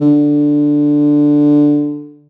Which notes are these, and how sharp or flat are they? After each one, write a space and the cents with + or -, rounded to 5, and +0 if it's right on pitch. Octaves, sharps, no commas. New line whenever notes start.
D3 +0